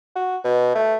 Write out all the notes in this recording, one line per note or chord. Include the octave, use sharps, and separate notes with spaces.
F#4
B2
A3